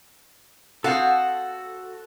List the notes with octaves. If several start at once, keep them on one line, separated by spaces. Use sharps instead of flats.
C4 F#4 A4 F5 F#5 A5 D#6